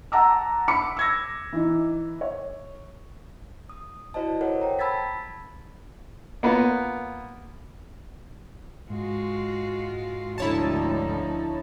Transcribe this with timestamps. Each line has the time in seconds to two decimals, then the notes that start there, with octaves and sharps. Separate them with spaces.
0.12 F#5 A5 A#5 D6 E6
0.68 B5 D6 B6 C#7
0.97 E6 G#6 A#6
1.52 E3 D#4
2.21 C#5
3.70 D#6
4.14 E4 F#4 C5 D5 D#5 A5
4.41 A4 A#4 C5 C#5 F#5
4.61 G5 A#5
4.79 A5 B5 E6 G#6 A6 B6
6.43 A#3 B3 F4
8.89 G#2 G#3 F4 F#4
10.38 D2 D3 F3 C#4 D#4 E4 C#5 A5